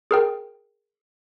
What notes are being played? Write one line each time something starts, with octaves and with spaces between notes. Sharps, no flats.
G#4 A#4 G5